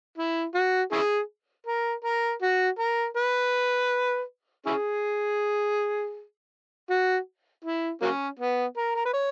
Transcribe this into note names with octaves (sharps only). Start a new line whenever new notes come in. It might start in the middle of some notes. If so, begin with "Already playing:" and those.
E4
F#4
C#4 E4 G#4
A#4
A#4
F#4
A#4
B4
C#4 E4 G#4
F#4
E4
F#3 A#3 C#4
B3
A#4
A#4
B4
C#5